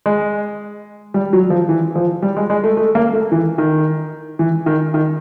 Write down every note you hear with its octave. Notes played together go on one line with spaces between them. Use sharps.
G#3
G3
F#3
F3
E3
F3
G3
G#3
G#3
A3
A3
A#3
A3
E3
D#3
E3
D#3
D#3